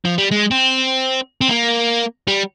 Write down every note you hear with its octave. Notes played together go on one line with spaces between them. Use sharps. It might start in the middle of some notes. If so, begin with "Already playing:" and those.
F3
G3
G#3
C4
C4
A#3
G3